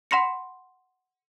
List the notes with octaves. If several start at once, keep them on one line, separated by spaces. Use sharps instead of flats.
F#5 B5 C6 A#6 C#7